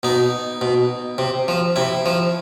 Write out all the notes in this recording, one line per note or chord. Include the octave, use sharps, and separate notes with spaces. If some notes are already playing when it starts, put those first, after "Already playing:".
B2 D#4
B2
C3
F3
C3 E4
F3